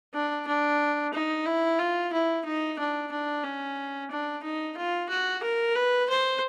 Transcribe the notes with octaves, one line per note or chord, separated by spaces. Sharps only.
D4
D4
D#4
E4
F4
E4
D#4
D4
D4
C#4
D4
D#4
F4
F#4
A#4
B4
C5